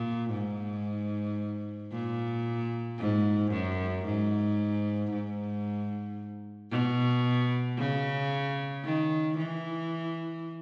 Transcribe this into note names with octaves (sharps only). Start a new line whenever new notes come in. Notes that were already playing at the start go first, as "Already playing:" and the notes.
Already playing: A#2
G#2
A#2
G#2
F#2
G#2
G#2
B2
C#3
D#3
E3